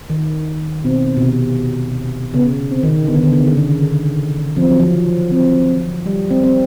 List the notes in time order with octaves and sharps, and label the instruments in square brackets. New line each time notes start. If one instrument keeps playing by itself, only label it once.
[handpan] D#3
[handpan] B2 [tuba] C4
[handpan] B2
C3
[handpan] C#3 [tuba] B3
[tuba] C4
[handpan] D#3
[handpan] D3 [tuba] B3
[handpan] D#3
D3
C#3
D3
C#3
D3
[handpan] F3 [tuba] C4
[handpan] F#3
F3
[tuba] C4
[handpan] G3
C4
C4